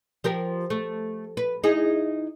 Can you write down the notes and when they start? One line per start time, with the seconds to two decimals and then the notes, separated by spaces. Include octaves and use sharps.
0.24 F3 G4 A#4
0.70 A3
1.37 B4
1.64 D#4 E4 G#4